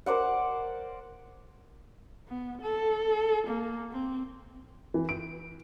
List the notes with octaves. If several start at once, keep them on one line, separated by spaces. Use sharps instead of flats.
A#4 C5 D5 F#5
B3
A4
A#3
C4
E3
D7